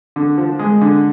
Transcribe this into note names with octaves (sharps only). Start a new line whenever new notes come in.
D3
F3
G#3
D3